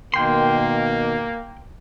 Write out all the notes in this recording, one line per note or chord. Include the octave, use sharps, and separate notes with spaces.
B2 D#3 A#3 G5 C6